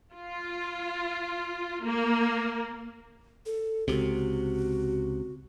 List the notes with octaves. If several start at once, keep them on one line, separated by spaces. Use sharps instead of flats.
F4
A#3
A4
C#2 C3 F#4